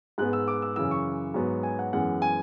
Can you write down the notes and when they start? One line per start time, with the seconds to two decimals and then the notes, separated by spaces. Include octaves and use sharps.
0.18 G#2 G#3 B3 F#6
0.33 E6
0.48 D6
0.62 E6
0.76 F#2 C#3 E3 E6
0.91 C#6
1.34 G#2 F#3 B3
1.63 G#5
1.79 F#5
1.93 F#2 E3 G#3 B3 F#5
2.22 G#5